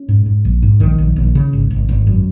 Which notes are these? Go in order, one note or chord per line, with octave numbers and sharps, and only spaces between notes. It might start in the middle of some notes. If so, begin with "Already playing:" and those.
Already playing: C#4
G#2
G#2
A#1
G#2
A#1 D#3
A#1
A#1
C#3
G#1
G#1
G#1
F#2